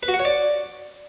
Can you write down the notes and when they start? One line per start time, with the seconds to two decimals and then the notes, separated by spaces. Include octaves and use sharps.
0.03 B4
0.08 F#4
0.14 F#5
0.19 C#5
0.25 D5